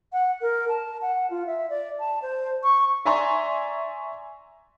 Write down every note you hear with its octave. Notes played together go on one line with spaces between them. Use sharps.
F#5
A#4
A5
F#5
F4
E5
D5
A5
C5
C#6
D5 E5 G#5 A#5 C6 C#6